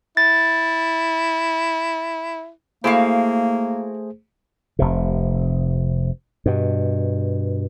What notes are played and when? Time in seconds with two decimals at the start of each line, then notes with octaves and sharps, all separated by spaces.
0.17 E4 A6
2.84 A3 A#3 E4 F#4 G#4 C5 F5
4.79 F1 C3
6.46 G2 B2